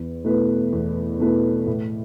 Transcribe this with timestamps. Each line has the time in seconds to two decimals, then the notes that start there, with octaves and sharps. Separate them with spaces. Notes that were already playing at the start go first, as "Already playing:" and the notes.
Already playing: E2
0.24 B2 A3 E4 B4
0.72 E2
1.20 B2 A3 E4 B4
1.66 A2